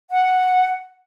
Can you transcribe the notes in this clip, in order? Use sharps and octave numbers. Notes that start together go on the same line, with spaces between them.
F#5